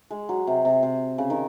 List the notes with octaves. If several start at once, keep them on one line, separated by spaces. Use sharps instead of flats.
G#3
F#3
C3
C3
C3
C#3
D#3